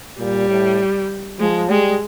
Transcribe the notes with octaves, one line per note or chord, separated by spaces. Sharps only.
A#2 G3
A2
F3 G#3
G3 G#3